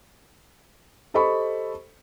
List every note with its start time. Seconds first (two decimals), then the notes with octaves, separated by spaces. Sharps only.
1.14 G4 A4 C5 D#5 B5 C#6